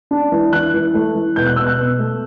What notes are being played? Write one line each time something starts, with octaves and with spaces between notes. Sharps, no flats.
D4
E3
E3 F#6
E3
A3
E3
B2 G6
F#6
B2 E6
F#6
B2
A3